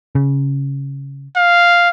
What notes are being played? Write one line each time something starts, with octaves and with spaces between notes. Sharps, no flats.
C#3
F5